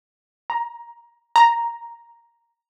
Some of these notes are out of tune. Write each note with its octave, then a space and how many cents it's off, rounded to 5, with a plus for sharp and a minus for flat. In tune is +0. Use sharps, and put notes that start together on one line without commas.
A#5 +15
A#5 +5